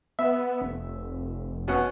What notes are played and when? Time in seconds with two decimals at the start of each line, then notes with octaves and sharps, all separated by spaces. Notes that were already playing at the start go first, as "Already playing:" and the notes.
0.19 B3 E5
0.62 F1
1.68 B2 C#4 F#5